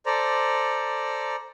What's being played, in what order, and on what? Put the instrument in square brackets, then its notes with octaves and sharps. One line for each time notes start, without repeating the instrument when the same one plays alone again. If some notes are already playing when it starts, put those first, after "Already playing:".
[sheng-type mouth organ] A4 C5 D5 A#5